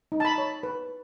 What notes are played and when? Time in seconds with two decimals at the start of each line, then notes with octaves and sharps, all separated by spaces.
0.12 D#4
0.20 A5
0.25 B5
0.38 C#5
0.63 B4